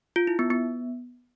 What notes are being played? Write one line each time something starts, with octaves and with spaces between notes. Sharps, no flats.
F4
E4
B3
B3